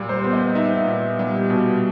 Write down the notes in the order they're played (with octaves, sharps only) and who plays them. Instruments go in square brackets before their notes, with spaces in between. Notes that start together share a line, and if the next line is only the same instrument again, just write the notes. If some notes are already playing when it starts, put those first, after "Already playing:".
Already playing: [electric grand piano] A#2 G3
[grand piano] C5
[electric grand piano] B3
[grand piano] D#5
[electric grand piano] D#4 [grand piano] E5
[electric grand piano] A#2
G3
B2